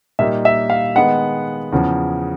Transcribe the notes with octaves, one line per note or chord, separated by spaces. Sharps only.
A#2 G3 A#3 D#4 E5
E5
F5
D#3 G#3 B3 F#5
E2 C#3 F3